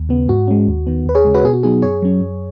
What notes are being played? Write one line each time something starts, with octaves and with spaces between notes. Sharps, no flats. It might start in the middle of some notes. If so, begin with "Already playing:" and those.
Already playing: D#2
C#3 B3
G#2 F#4
G#3 C#4
D#2
D#3 B3
D#2 B4
G#4 C#5
C#3 G#3
F#4 B4
B2 G#4
F#4
F#3 B3 D#4 G#4
F#2 G#4 C#5
F#3 C#4
F#2